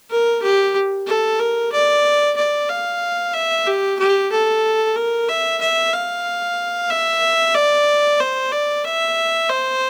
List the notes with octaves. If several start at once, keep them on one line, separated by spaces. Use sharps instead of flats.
A#4
G4
A4
A#4
D5
D5
F5
E5
G4
G4
A4
A#4
E5
E5
F5
E5
D5
C5
D5
E5
C5